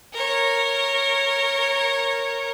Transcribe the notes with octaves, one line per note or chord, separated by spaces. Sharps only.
A#4 C#5